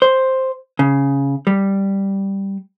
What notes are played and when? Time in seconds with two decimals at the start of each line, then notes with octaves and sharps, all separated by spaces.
0.02 C5
0.79 C#3
1.47 G3